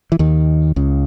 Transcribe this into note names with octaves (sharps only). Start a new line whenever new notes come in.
E3
D#2 D#3
C#2 C#3